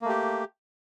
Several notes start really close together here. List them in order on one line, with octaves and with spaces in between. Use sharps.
A#3 A3 G4